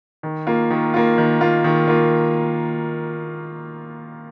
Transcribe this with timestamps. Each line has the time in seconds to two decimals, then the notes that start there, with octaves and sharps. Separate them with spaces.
0.23 D#3
0.47 A#3 F4
0.70 D#3
0.94 A#3 F4
1.18 D#3
1.41 A#3 F4
1.64 D#3
1.87 A#3 F4